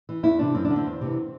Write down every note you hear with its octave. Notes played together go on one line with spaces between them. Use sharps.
E3
E2 E4
C3 E3 D4
F#2 C4
D4
D3
C4
E2
C3 E3